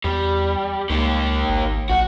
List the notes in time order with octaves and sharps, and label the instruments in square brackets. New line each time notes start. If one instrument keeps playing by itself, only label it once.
[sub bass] E2 [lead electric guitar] G3
[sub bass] C#2 [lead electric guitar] D#3 A#3
[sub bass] G#1
[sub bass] B1 [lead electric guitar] F#4